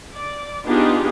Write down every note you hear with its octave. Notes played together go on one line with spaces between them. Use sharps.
D5
B3 D4 D#4 F4 G4 G#4